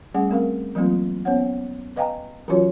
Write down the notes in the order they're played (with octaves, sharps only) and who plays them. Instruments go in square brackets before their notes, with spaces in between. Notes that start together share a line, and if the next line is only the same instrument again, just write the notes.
[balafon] G3 A3 C#4 G#4 F#5
A3 C4 A#4 F5
E3 F#3 A3 A#3 C4 F4
B3 C#4 C5 C#5 F#5
B4 D#5 F5 G5 G#5 A#5
E3 F#3 C#4 F4 F#4 C#5